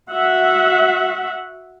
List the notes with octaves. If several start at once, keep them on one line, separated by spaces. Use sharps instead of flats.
F#4 E5 F#5